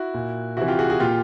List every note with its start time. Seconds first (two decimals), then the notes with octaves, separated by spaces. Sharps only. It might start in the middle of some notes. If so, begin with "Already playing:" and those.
Already playing: E4 F#4
0.14 A#2
0.57 C3 E3 E4 F#4
0.68 F4 G4
0.79 F#4 G#4
0.90 F#4 G#4
1.00 A#2 F4 G4